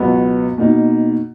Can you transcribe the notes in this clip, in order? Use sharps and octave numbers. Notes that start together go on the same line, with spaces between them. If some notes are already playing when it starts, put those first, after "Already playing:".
Already playing: C#2 B2 F#3 B3 F#4
B2 A#3 D#4